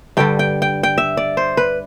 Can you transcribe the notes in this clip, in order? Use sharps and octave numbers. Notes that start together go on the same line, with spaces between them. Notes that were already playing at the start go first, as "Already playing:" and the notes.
G2 D3 G3 G5
G5
G5
G5
E5
D5
C5
B4